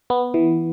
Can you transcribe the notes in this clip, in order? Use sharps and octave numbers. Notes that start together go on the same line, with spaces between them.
B3
E3